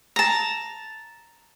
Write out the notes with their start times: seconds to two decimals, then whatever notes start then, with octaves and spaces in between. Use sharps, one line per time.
0.16 A5 A#5